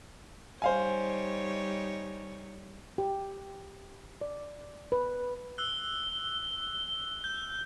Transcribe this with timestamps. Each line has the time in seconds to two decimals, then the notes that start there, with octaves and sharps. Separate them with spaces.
0.62 G3 D#4 C5 C#5 F5 G#5
2.98 G4
4.21 D5
4.92 B4
5.58 E6 F#6 G7
7.24 G6